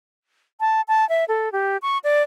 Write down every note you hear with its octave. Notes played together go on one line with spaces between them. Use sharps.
A5
A5
E5
A4
G4
C#6
D5